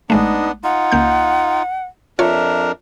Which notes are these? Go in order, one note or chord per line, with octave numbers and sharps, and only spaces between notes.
A1 G#3 A3 B3 D4 D#4
D#4 F4 F#5
C#2 A#3 G6
F2 D4 F4 A#4 C#5 E5